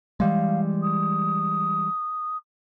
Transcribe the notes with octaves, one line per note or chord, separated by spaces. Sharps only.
E3 G3 G#3 F5
D#6